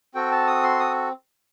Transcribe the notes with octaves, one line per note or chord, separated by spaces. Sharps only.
C4 F#4 A4 G5
A5
D#6
C6
D#6